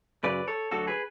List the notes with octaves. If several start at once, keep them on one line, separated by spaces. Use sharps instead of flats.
F#2 C#3 F#3 B4 D5
A4 C#5
D2 D3 F#3 F#4 A4
G#4 B4